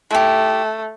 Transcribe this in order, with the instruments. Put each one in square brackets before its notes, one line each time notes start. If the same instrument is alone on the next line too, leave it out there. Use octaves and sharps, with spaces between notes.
[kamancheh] A3 [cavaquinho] E4 G4